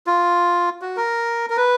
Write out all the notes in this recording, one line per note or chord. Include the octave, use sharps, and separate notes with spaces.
F4
F#4
A#4
A#4
B4